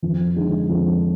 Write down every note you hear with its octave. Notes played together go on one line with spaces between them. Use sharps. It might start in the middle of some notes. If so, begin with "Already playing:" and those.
F2
D3 G#3 D#4
F2